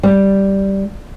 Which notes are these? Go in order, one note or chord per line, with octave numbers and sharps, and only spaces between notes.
G3